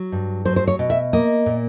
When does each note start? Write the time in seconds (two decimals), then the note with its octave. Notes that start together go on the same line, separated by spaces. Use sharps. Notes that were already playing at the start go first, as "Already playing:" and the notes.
Already playing: F#3
0.12 G2
0.45 F#3 C5
0.56 C5
0.68 C#5
0.79 B2
0.90 E5
1.13 A#3 D#5
1.46 A#2